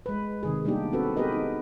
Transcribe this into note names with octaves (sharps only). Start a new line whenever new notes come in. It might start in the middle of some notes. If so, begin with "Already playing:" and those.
G#3 B4
C3 D#3 G#4
G3 A#3 B3 D4 D#4 G4
C4 F#4 A4 B4
B3 G4 G#4 A#4 B4 D#5
D#4